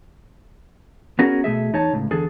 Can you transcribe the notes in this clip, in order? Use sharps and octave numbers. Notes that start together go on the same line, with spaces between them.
B3 C#4 F#4 G#4 A#4
B2 A3 G#4 E5
E2 D#4 C#5 A5
C#2 A2
E2 D3 G#4 A4